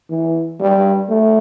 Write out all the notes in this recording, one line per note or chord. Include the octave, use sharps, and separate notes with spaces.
E3
G3
A3